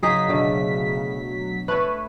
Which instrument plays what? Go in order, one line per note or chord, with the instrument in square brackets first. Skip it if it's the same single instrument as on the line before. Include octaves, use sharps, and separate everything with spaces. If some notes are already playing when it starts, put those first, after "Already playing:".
[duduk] C#3 [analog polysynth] F#3 B6 [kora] A#3 D#4 G#4
[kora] B2 D3 A3
[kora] A3 C#5 [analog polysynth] B4